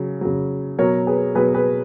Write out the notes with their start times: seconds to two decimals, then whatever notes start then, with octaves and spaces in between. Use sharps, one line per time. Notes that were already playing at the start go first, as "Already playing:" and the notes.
Already playing: C#3 F#3
0.21 C#3 F#3
0.79 B2 F#3 A#4 C#5
1.07 G#4 B4
1.35 B2 F#3 G#4 B4
1.54 G#4 B4